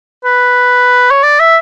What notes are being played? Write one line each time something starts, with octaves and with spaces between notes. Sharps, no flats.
B4
C#5
D5
E5